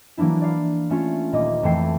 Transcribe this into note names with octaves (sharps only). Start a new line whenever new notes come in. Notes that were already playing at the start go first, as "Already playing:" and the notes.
E3 F#3 A#3 D4 E4
D5 F5
A3 C#4 F4
D#1 A#3 D#5 D6
F2 E3 A3 G5 C7